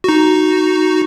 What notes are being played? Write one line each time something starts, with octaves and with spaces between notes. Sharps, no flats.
D#4 F#4